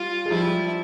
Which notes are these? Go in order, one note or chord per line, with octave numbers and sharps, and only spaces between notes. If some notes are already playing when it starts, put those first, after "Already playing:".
Already playing: G3 F4
G#3
F3 G3 E4